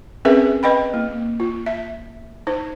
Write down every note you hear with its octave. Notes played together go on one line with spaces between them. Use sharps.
C4 C#4 G#4 A#4 B4 E5
B4 D#5 G5 B5
A#3
F4
E5
D#4 C5